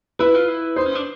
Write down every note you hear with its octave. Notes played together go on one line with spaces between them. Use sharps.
E4 B4
F4
E4
D#4 C5
C#4
D4